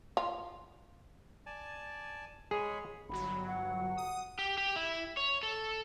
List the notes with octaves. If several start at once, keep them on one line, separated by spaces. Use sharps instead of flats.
F4
D5 G#5 A5
G#3 G#4 C#5 B5
G1 F#3 B5
F#5
D#6
G4
G4
E4
C#5
A4